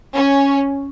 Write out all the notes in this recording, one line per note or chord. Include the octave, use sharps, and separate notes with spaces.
C#4